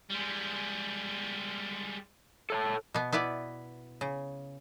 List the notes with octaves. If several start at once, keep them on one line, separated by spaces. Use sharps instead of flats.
G3 G#3
A4 C#5 A5
B2 B3
B3 E4 B4 D5
C#3